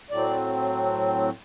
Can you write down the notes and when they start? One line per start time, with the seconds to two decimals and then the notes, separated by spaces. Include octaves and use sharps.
0.11 A2 F#3 C4 D5